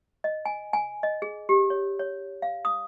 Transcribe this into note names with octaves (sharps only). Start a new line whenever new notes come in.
D#5
G#5
G#5
D#5
G#4
G4
C#5
C#5
F5
D#6